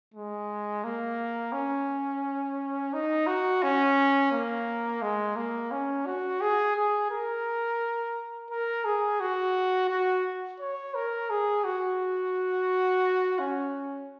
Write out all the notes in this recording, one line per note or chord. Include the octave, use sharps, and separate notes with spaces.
G#3
A#3
C#4
D#4
F#4
C#4
A#3
G#3
A#3
C#4
F#4
G#4
G#4
A#4
A#4
G#4
F#4
F#4
C#5
A#4
G#4
F#4
C#4